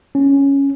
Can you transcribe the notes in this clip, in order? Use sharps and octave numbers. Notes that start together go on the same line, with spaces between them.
C#4